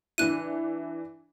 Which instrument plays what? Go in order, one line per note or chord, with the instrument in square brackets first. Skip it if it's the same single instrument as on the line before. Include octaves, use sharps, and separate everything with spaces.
[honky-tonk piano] E3 D4 E4 [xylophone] F#6 D#7